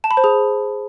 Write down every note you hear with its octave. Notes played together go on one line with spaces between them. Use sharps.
A5
B5
C5
G#4